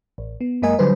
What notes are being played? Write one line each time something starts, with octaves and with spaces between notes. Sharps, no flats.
A1
B3
F#2 G#3 A#3 A#4 D#5 G#5
D3 F#3 G3 B4 C5